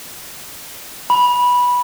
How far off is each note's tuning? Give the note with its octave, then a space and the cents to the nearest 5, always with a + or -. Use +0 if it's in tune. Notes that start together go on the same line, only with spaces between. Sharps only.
B5 -10